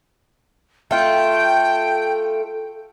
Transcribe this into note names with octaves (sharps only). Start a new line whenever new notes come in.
A3 F4 G5